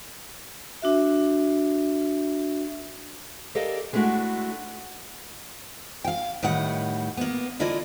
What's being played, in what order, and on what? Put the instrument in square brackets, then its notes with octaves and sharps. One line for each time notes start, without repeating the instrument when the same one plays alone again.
[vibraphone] D4 F#4 E5
[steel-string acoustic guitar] G4 A4 A#4 D5 D#5 F5
G#3 A3 D4 E4 F#4
F5 G5
A2 D#3 G3 F#5
A#3 B3
D3 A#3 E4 F4 D5 D#5